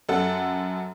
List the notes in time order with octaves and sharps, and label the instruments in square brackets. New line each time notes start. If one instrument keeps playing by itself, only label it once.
[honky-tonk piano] F#2 A4 F#5